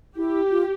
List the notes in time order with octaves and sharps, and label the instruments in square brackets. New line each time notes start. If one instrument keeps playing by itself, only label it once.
[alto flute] E4 [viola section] G4
[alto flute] F4